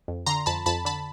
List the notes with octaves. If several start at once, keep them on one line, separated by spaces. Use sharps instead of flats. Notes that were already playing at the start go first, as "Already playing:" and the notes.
F2
D3 A#5 C6
F2 A5 B5
F2 A5 B5
D3 A5 B5